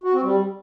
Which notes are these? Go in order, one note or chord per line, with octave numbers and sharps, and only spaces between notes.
F#4
C4
G3